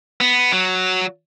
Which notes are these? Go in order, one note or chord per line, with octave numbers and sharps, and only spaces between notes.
B3
F#3